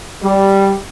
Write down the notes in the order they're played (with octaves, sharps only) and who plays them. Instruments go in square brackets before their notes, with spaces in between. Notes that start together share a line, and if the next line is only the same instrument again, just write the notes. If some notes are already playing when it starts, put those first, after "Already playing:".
[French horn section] G3